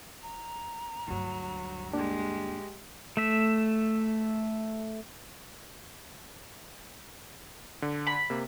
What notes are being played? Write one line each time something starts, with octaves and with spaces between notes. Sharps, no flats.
A#5
D2 G2 F#3
G#3 A#3 D4 G4
A3 E5
D3
B5
C3 A#3